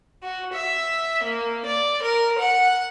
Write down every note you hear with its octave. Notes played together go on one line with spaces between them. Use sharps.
F#4
E5
A#3
D5
A#4
F#5